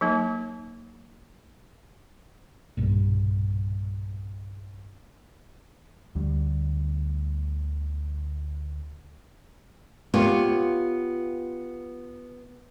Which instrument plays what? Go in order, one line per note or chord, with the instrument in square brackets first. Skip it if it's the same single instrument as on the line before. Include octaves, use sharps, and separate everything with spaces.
[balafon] F#3 A#3 D#4
[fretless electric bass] B1 G2 A#2
[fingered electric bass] D2 D3 G3
[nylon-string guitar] B3 F4 G4 C#5